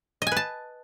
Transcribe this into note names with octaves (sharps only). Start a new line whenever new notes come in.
B4 D#5 G#5 A5